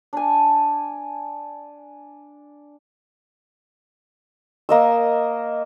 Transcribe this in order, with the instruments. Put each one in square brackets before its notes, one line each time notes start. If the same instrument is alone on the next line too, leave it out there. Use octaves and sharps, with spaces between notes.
[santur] D4 G#5
A#3 D#5 E6